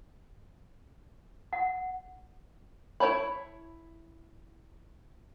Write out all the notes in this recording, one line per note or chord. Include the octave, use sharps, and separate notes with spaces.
F#5
E4 B4 C#5 A5 B5